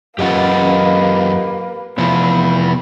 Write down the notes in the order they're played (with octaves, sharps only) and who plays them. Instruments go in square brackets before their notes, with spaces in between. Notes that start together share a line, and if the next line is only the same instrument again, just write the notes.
[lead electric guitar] F#2 F4 [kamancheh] A#3 B4 [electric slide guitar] G4 D#5 F#5
[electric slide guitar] C3 F3 [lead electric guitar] B3 E4 [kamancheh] B5